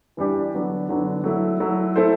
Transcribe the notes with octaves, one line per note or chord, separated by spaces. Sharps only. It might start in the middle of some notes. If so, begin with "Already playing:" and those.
E3 G3 D4 G4
D3 F#3 B3 D4
D3 F#3 B3 D4
F#3 A3 E4
F#3 A3 E4
A3 E4 A4 C5